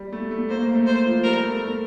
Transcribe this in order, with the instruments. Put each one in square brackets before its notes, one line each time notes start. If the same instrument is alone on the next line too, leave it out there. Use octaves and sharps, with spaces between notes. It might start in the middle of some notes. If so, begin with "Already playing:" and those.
Already playing: [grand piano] G3
A3
A3
[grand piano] A#3 [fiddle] C5
[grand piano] A#3
A3
[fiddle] C5
[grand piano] F3
[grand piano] G3 [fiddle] A#4
[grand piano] A3
A3